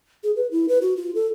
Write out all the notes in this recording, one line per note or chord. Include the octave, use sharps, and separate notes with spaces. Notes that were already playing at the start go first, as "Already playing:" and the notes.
G#4
B4
E4
B4
F#4
F4
A4